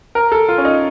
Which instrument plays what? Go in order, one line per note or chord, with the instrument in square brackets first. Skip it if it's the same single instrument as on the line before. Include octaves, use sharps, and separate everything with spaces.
[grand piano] A#4
A4
F4
C#4
D#4